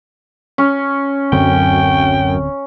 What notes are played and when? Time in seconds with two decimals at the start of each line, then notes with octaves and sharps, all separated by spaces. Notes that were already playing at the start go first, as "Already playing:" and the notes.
0.58 C#4
1.32 D1 F#2 D3 C4 G5